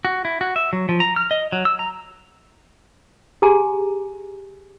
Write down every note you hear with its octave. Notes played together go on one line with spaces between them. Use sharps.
F#4
E4
F#4
E5
F#3
F3
A#5
F6
D#5
F#3
E6
A#5
G4 G#4 G#5 A#5